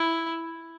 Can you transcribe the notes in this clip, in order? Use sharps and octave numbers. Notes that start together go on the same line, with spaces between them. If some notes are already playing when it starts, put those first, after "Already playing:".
Already playing: E4